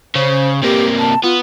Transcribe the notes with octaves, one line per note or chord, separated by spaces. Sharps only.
C#3 C5
C3 A#3 G4
A5
B3 F4